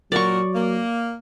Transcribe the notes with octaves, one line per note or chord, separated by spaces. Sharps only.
A#2 F#3 F#4 A#4 D5 C#6
A#3